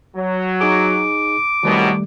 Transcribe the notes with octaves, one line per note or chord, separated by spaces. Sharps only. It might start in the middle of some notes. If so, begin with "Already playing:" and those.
F#3
D#4 G#4 D6
C2 F#2 B2 D#3 G3 A3